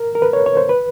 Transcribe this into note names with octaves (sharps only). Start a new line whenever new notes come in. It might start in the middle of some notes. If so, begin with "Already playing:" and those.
Already playing: A#4
A#4
B4
C#5
C#5
C5
B4